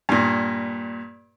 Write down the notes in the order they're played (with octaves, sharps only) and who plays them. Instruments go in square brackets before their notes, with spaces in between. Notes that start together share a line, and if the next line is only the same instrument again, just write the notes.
[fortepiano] G2 A#2